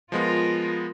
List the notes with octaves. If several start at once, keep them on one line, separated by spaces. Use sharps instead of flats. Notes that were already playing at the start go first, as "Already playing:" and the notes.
F3 G#3 B3 F4 A#4